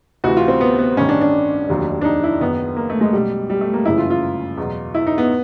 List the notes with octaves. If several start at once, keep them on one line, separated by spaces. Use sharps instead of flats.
D2 C3 E3 F#4
F4
C4
B3
B3
A1 G2 D#3 C#4
D4
D4
F1 D#2 D#3 F#3
D4
D#4
E4
F#1 F#2 D#3 B3
A#3
A3
G#3
B1 B2 F#3 G3
G3
A3
A#3
G1 F#2 C#3 E3 E4
F4
F4
E2 B2 F#3
E4
D#4
B3